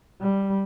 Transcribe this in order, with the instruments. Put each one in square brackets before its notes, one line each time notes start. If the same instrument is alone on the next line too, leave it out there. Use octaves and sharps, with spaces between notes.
[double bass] G3